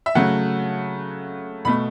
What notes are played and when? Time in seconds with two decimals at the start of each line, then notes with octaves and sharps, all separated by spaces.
0.06 E5
0.15 C#3 F#3 A3 F#5
1.65 B2 A3 B5